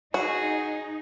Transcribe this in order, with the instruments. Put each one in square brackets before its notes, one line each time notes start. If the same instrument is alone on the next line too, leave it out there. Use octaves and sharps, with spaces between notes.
[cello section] D#4 [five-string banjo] F#4 [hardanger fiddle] G#4